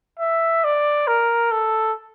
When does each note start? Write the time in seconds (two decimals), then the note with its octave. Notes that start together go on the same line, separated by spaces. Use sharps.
0.20 E5
0.64 D5
1.07 A#4
1.51 A4